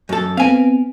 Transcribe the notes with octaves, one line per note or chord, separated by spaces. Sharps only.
F#2 A4
B3 C4 F5 G#5